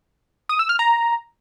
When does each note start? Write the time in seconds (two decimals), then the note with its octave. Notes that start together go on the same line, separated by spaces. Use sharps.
0.49 D#6
0.59 E6
0.69 F6
0.79 A#5